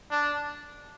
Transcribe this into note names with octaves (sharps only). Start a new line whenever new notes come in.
D4